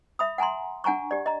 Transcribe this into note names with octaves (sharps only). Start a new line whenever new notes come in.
E5 B5 D#6
F#5 G#5 A#5 C6
D4 F#5 G#5 A#5 C#6
G4 D5
D#5 A#5